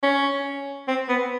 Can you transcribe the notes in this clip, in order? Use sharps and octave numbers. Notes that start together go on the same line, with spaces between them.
C#4
C4
B3